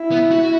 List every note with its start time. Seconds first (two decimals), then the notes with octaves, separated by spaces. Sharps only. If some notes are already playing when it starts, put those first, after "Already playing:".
Already playing: E4
0.11 B3
0.31 F#4